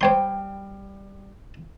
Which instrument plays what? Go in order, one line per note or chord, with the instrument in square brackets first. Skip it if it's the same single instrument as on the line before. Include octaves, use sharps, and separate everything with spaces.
[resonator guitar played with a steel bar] G3 G5 [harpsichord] C5 C#5 C6